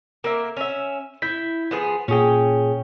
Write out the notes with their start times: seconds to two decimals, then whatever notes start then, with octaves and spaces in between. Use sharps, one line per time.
0.24 A#3 A#4 E5
0.57 C#4 E5
1.22 E4 G6 B6
1.71 F3 B3 G#4
2.08 A#2 C#4 G#4 G5